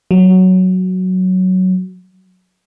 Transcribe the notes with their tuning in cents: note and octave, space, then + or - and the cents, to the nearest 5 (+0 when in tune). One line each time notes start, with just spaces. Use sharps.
F#3 +5